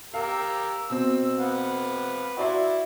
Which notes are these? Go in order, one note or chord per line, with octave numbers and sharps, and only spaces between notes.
G4 A#4 F5 E6
B2 C4 E6
B4 F5 F#5
E4 F#4 D5 C6